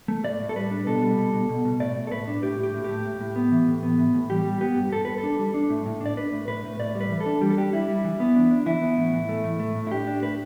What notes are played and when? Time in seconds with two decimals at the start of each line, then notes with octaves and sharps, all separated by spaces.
0.08 A3
0.24 A2 D5
0.40 A2
0.49 A4
0.56 G3 B4
0.71 D4
0.87 B2 A4
1.02 G3
1.18 B2
1.33 B2
1.49 B2
1.65 B2
1.80 A2 D5
1.95 A2
2.07 A4
2.11 A2 B4
2.28 D4
2.42 A2 G4
2.58 A2
2.63 G4
2.74 A2
2.84 A3 G4
3.05 A2
3.21 A2
3.36 B3
3.52 E3
3.67 A2
3.83 B3
3.99 E3
4.14 A2
4.30 G3 G4
4.45 G3
4.61 B3 G4
4.76 G2
4.92 G2 A4
5.05 G2 B4
5.18 A4
5.23 D4
5.39 G3
5.54 D4
5.70 A2
5.86 A2
6.01 D4 D5
6.17 D4 B4
6.33 A2
6.48 A2 B4
6.64 A2
6.79 A2 D5
6.95 G3
7.01 B4
7.10 E3
7.20 A4
7.26 D4
7.41 G3 G4
7.50 A4
7.57 D4 G4
7.73 G3 E4
7.88 G3
8.04 E3
8.20 B3
8.35 D4
8.51 D4
8.66 E3 E4
8.81 B3
8.97 A2
9.13 E3
9.29 A3
9.44 A2
9.60 A3
9.75 A2
9.87 E4
9.91 D4 G4
10.07 D4
10.22 A2 B4